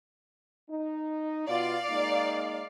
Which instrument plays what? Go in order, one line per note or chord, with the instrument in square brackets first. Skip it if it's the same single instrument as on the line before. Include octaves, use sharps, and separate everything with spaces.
[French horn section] D#4
[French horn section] B2 F4 [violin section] D5 F5
[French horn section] G#3 A#3 D#4